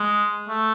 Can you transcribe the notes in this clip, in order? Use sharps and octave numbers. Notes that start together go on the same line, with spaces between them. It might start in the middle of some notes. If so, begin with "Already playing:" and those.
Already playing: G#3
A3